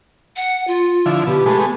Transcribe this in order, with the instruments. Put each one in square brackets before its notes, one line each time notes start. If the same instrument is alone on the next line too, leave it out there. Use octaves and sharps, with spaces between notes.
[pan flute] F#5
F4
[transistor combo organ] D3 F3 E4
[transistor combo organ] B2 [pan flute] G4
[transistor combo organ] G#3 A3 B3